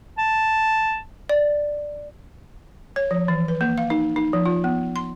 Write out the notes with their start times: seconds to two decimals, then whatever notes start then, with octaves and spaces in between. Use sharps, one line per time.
0.18 A5
1.29 D5
2.96 C#5
3.11 F3
3.28 E3
3.48 B4
3.61 A#3
3.78 F5
3.90 D#4
4.16 D#4
4.33 F3
4.45 F4
4.64 B3
4.96 C6